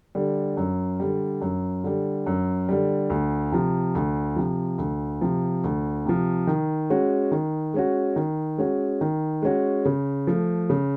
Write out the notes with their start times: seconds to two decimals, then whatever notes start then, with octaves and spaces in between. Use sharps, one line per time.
0.15 D3 G3
0.57 F#2
1.00 D3 G3
1.42 F#2
1.84 D3 G3
2.27 F#2
2.69 D3 G3
3.10 D2
3.52 C3 F3
3.95 D2
4.36 C3 F3
4.78 D2
5.21 C3 F3
5.64 D2
6.06 C3 F3
6.47 D#3
6.90 G#3 C#4 F#4
7.31 D#3
7.74 G#3 C#4 F#4
8.16 D#3
8.58 G#3 C#4 F#4
9.01 D#3
9.42 G#3 C#4 F#4
9.85 C#3
10.27 F3 A3
10.70 C#3